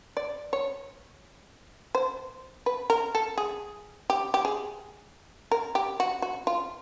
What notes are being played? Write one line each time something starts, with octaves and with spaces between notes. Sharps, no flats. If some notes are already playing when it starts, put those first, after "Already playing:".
D5
C#5
C5
B4
A#4
A4
G#4
G4
G4
G#4
A#4
G4
F#4
F#4
F4